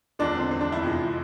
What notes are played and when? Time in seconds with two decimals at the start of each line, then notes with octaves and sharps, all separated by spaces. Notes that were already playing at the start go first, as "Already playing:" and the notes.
0.19 E2 D3 F3 G#3 D4
0.35 C4
0.51 C4
0.61 D4
0.72 E4
0.82 F2 C3 F3 G#3